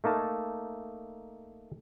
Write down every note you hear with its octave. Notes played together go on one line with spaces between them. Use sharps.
A3 A#3 D#4 A5